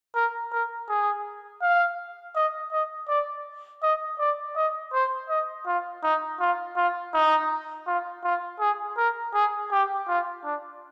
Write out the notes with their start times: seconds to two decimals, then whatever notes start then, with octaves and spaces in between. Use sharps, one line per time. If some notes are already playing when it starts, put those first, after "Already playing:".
0.15 A#4
0.52 A#4
0.89 G#4
1.62 F5
2.35 D#5
2.72 D#5
3.08 D5
3.82 D#5
4.19 D5
4.56 D#5
4.93 C5
5.29 D#5
5.67 F4
6.03 D#4
6.40 F4
6.76 F4
7.14 D#4
7.87 F4
8.24 F4
8.60 G#4
8.97 A#4
9.34 G#4
9.71 G4
10.08 F4
10.44 D4